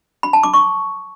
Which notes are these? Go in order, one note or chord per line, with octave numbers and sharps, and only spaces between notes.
B5
A5
D6
C#6